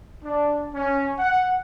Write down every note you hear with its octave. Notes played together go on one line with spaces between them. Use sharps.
D4
C#4
F#5